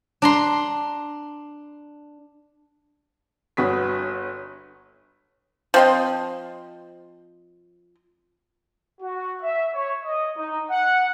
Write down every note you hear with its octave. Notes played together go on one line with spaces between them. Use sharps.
D4 A#5 C6
G1 F#4 B4 C#5 D#6 B6
F3 C4 D#5
F#4
E5
C#5
D#5
D#4
F#5